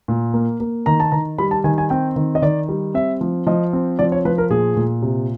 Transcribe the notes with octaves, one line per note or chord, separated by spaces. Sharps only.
A#2
A#3
A#3
D#3 A#5
A5
D#3 A#5
G3 B5
A5
D#3 G#5
G#5
C4 G5
D#3
D#5
D#3 D5
G3
C4 E5
F3
F3 D#5
C4
F3 D5
C#5
F3 B4
A#4
A#2 G#4
A#2
C3